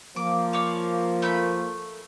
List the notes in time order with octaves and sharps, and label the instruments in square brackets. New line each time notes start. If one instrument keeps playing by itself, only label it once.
[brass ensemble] F3 A#3 [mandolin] D6
[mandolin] C#5 D5 F5
A3 B5 G6